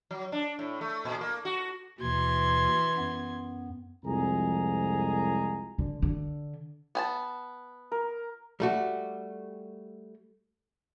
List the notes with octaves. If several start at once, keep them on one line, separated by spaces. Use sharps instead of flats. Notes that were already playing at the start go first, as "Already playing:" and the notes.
F#3
D4
A2
A3
A#2
A#3
F#4
D#2 B2 E3 C6 G#6
F#2 B3
C2 F2 F3 G#3 G#4 A#5
D3
D3
B3 G#5 A5
A#4
G3 A3 F#4